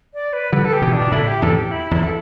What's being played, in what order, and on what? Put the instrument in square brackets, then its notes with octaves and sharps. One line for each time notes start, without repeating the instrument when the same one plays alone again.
[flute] D5
B4
[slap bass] D3 G3 [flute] B4
[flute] A4
G4
[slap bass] B2 E3
[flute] D4
[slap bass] B2
[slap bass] A2 D3 [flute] E4
[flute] G4
[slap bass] E2 A2 [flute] A4
[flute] G4
E4
[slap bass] E2 [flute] E4
[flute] A4